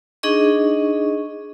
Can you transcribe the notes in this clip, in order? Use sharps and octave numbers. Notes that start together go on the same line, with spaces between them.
D4 D#4 G#4 D#5 C#6